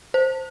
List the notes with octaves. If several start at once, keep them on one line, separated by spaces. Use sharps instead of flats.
C5